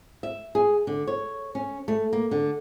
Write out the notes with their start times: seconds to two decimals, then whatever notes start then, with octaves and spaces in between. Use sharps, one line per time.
0.23 E5
0.55 G#4
0.87 D3
1.07 C#5
1.55 C#4
1.88 A3
2.13 A#3
2.31 D3